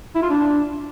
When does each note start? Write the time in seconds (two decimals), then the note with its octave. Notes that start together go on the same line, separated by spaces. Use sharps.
0.15 E4
0.22 F4
0.30 D4